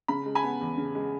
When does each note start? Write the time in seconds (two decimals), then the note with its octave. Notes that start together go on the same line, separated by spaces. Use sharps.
0.08 C#3 B5
0.26 G#3
0.35 G#5 B5
0.43 B3
0.61 E2
0.78 C#3
0.95 G#3